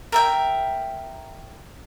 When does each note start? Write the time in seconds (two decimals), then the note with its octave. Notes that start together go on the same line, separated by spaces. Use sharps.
0.12 A#4 E5 G5